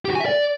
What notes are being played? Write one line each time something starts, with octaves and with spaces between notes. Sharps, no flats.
G4
F#4
G#5
E5
D5